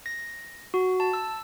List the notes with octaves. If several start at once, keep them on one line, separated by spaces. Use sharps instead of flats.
A#6
F#4
A5
E6